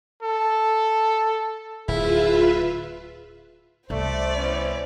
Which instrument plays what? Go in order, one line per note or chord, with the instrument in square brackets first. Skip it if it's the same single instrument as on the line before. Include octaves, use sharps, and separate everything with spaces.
[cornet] A4
[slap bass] D1 [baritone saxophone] E4 [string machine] F4 B4 E5 [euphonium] G#4
[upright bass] C2 [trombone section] A3 [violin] C5 D5
[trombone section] B3 C#4 E4